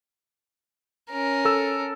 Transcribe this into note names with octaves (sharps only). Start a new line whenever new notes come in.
C#4 A#4
A4 E6